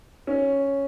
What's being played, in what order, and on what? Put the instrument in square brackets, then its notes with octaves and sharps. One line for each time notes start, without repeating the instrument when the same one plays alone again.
[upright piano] C#4